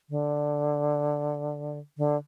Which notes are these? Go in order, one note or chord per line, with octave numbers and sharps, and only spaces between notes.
D3
D3